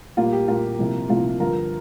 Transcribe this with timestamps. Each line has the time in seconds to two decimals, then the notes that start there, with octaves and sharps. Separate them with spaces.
0.17 A#2 G3 A#3 F4
0.33 G4
0.48 A#2 G3 A#3 F4 A#4
0.79 C2 C3 F3 A#3
1.09 C2 C3 F3 A#3 F4
1.40 G2 D3 F3 F4 A#4